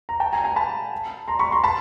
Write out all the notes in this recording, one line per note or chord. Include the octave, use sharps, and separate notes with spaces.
A#5
G5 A5
G#5 A#5
G#5 A#5
A5 B5
A#5 C6
B5 C#6
A#5 C6
A5 B5